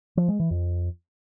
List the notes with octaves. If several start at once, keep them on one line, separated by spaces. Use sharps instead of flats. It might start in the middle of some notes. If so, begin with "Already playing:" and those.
F3
G#3
E3
F2